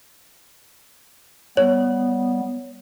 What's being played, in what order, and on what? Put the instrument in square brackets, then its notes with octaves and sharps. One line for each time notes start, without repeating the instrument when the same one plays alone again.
[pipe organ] G3 B3 [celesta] C#5